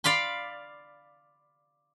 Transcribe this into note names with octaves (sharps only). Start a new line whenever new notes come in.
D5 F5 B5 C6